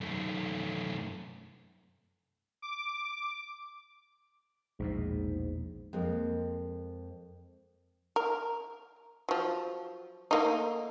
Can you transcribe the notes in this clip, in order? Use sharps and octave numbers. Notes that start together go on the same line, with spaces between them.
F#2 A3
D6
A#1 E2 G#2 B2
F2 G#3 A#3
A#4
F3 F#3
A3 A#3 D#4